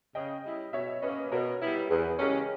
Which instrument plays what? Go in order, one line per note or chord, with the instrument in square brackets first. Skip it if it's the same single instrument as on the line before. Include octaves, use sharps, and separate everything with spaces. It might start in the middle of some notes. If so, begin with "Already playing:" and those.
[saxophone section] C#3 [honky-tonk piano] D#5 G5
[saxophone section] G3 C#4 E4
[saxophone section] B2 [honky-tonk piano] C#5 E5
[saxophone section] A#3 C#4 [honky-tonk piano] B4 D#5
[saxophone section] B2 [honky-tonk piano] A#4 C#5
[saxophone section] G3 B3 E4
[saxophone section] E2 [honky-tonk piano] G#4 B4
[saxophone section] C#3 E3 G#3 C#4 [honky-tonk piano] G4 A#4